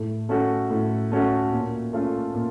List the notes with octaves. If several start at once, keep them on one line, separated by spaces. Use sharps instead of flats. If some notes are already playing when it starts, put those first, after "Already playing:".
Already playing: A2
A3 C#4 F#4 A4
A2
A3 C#4 F#4 A4
A#2
A3 C#4 F4 A4
A#2